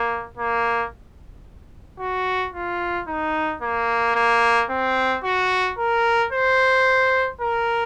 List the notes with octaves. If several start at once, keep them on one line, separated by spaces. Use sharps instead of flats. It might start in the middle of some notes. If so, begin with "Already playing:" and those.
Already playing: A#3
A#3
F#4
F4
D#4
A#3
A#3
C4
F#4
A#4
C5
A#4